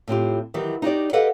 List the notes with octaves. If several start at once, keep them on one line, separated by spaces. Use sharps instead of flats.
A2 C4 F4 G4
D#3 E3 F#3 G4
D#4 F#4 G4 D5
G4 A4 B4 D#5 F5 F#5